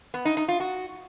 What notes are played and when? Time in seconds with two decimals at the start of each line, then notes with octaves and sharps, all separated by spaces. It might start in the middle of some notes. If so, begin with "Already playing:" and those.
0.14 B3
0.25 D#4
0.37 D#4
0.48 F4
0.60 F#4